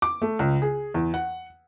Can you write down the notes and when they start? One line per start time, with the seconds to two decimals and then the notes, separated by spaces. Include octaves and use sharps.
0.02 D6
0.22 A3
0.39 C#2
0.62 G#4
0.94 E2
1.14 F#5